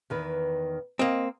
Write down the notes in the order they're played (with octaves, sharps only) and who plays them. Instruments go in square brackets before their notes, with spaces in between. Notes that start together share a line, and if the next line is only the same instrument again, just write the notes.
[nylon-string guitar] E2 D#3 B4
[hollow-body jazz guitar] A#3 C4 [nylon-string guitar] D#5